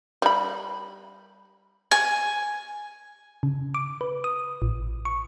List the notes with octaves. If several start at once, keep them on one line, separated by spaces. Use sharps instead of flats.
G3 B5
G#5
C#3
D6
B4
D#6
A1
C#6